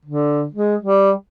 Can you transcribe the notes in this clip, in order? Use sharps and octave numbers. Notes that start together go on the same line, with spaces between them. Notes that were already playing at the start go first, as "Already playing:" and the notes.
D3
G#3
G3